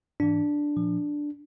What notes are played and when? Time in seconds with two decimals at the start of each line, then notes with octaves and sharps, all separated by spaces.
0.20 G#2 E3 D4
0.76 A#2 F3